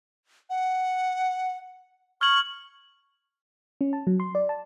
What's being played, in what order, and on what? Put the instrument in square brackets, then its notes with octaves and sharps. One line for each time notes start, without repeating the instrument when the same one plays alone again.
[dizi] F#5
[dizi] C#6 [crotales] F6 G#6 F#7
[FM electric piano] C#4
A5
F#3
C6
D5
A5